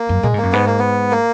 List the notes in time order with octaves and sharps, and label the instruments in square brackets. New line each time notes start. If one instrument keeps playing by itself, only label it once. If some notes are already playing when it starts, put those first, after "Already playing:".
Already playing: [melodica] A#3
[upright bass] F#2
[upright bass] A#2 [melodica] G#3
[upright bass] G#2 [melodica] A#3
[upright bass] F#2
[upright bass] G#2 [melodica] B3
[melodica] A#3
B3
A#3